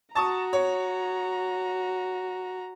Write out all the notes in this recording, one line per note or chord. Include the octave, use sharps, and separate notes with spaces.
F#4 A5 A#5 C#6 D#6
C#5